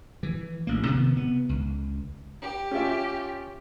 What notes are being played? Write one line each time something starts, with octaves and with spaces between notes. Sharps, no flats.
E3
A1 A#3
C3 D#3 B3
C3 B3
C#2
G4
C#4 F4 E5